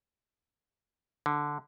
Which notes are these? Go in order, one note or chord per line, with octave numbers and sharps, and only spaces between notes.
D3